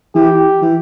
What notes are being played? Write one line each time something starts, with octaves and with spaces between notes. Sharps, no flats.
E3 G4
E3